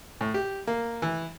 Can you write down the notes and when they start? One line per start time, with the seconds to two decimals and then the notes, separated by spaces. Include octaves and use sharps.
0.21 A2
0.34 G4
0.67 A#3
1.02 E3